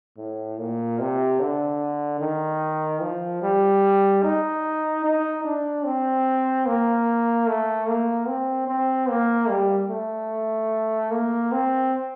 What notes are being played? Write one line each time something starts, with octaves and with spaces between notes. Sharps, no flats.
A2
A#2
C3
D3
D#3
F3
G3
D#4
D#4
D4
C4
A#3
A3
A#3
C4
C4
A#3
G3
A3
A#3
C4